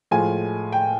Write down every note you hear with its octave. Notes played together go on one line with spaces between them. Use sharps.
A2 F3 G#3 G#5
G5